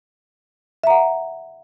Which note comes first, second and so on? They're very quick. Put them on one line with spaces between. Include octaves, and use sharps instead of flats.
E5 A#5 F#5